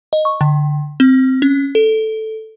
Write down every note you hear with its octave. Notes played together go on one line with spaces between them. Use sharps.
D#5
C#6
D3
C4
C#4
A4